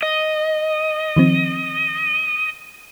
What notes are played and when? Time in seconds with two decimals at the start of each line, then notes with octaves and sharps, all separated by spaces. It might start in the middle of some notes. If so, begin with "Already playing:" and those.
0.03 D#5
1.16 D#3 F3 C4